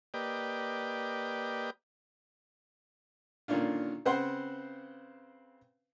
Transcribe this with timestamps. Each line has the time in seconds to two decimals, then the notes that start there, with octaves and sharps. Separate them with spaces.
0.14 A#3 G4 B4 D5 D#5 G5
3.48 A#2 D3 D#3 C#4 D4 F4
4.06 C#3 C4 B4 C5 F#5 C6